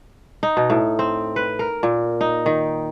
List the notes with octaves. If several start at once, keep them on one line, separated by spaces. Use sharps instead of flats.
D#4
B2
A2
C4
B4
A#4
A#2
D#4
D#3